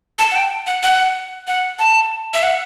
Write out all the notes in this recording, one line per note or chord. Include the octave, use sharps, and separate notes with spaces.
A5
F#5
G5
F#5
F#5
F#5
A5
E5
F#5